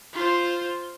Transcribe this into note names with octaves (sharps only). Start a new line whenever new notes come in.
F4 C5